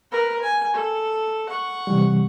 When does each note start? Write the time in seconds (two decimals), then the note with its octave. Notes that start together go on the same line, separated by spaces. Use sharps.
0.12 A#4 B4
0.42 G#5
0.74 A4
1.49 F#5 C#6
1.87 C3 E3 G3